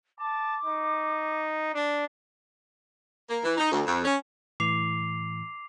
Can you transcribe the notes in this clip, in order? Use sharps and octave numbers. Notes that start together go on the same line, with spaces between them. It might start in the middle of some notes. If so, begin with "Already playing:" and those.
A5 D6
D#4
D4
A#3
E3
D#4
D2
F2
C#4
A2 E3 D6 C7 F7